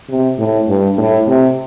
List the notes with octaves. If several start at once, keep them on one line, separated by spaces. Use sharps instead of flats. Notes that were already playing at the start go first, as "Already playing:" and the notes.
C3
A2
G2
A2
C3